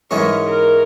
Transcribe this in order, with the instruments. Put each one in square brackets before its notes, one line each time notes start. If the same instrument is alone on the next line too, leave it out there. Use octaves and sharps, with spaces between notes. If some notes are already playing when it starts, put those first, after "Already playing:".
[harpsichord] G#2 E3 G#3 C#4 [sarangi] A#4
[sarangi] A#4